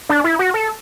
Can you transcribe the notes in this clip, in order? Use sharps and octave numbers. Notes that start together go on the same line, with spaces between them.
D4
E4
F#4
A4